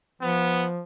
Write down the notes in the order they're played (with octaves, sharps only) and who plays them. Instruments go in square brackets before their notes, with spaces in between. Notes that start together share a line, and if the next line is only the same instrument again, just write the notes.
[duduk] F3 [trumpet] B3